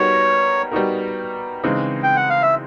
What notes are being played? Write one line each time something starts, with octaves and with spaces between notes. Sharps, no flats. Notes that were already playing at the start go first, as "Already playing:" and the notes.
Already playing: G3 B3 D#4 F#4 A#4 C#5
G3 B3 D#4 F#4 A#4
C#3 E3 G#3 C4 D#4
G5
F#5
F5
E5